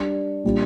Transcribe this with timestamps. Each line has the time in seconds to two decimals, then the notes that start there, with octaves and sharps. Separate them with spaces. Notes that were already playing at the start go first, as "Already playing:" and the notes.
Already playing: G3 D4 G4
0.44 A#2 G3 D4 F4